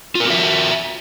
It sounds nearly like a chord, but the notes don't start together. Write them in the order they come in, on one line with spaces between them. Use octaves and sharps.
F4 A#4 F#4 E5